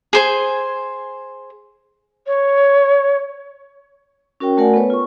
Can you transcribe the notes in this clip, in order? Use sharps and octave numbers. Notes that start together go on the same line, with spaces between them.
G#4 C5 G#5
C#5
C#4 F#4 A#4 C#5 G5
A3 F#4 A#4 D5 F#5 G#5
B3 A4 B4 C#5
F4 C#6